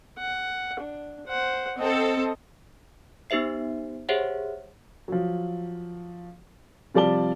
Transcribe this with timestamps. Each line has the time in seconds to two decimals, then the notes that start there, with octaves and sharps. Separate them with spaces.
0.18 F#5
0.80 D4
1.27 C5 F#5
1.78 C4 A4 D#5
3.30 B3 D#4 G4 C5 E5 C7
4.09 G4 G#4 C5 C#5 E5 F#5
5.08 F3 F#3
6.94 C3 F3 G3 D5 A5 G7